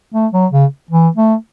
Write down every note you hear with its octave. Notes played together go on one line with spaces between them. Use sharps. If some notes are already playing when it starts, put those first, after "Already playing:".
A3
F#3
C#3
E3
A3